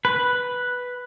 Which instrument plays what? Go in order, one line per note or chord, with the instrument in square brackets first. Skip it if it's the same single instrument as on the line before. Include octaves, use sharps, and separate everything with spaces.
[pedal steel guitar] B4